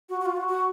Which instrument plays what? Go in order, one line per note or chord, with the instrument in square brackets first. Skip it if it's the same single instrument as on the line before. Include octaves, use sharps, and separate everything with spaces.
[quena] F#4
F#4
F4
F#4
F#4